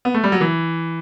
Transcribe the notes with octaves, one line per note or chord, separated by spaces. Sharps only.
B3
A3
G3
F#3
E3